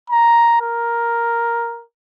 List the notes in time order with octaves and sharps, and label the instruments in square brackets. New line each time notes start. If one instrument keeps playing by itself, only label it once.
[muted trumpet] A#5
A#4